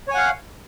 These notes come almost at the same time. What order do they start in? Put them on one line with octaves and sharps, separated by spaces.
C#5 G#5 F#5 F5